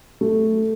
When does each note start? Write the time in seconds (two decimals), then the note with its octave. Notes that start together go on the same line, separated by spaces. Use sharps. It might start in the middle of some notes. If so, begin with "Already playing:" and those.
0.21 A3